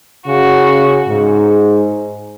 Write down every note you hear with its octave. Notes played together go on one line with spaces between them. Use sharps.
C#3 F#4
G#2